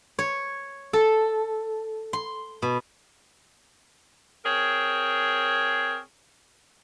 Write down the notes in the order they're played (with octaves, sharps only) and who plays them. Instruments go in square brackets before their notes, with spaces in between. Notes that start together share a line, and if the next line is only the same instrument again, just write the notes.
[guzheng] C#5
A4
C6
B2
[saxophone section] C4 G#4 A#4 C#5